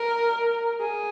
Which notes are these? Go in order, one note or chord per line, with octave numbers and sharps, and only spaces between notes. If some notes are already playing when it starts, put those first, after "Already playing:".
Already playing: A#4
G#4